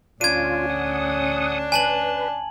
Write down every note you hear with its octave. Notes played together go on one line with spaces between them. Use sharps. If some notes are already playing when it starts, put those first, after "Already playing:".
D2 C#4 D4 F4 G#6 D#7
F#5 D#6
B4 G#5 A5 F#7